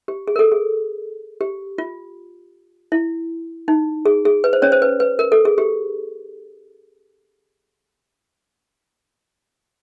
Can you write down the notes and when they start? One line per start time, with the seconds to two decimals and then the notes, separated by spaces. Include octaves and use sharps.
0.08 G4
0.28 G#4
0.36 A#4
0.39 A4
0.52 G#4
1.41 G4
1.78 F4
2.92 E4
3.68 D#4
4.06 G#4
4.25 G#4
4.44 B4
4.53 C5
4.62 C#4 C#5
4.72 C5
4.82 B4
5.00 B4
5.19 A#4
5.32 A4
5.45 G#4
5.58 G4